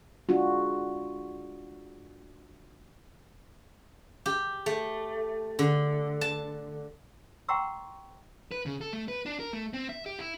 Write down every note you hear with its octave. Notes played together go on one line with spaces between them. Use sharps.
G#3 D4 F4 F#4
G4
A3
D3
A5
F#5 G5 A#5 C6 C#6 E6
B4
C#3
A4
A3
B4
D4
A#4
A3
C4
E5
G4
E4